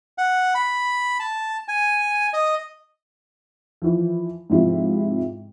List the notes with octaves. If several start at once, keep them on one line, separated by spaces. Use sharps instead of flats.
F#5
B5
A5
G#5
D#5
E3 F3
G#2 C3 F3 E4 F4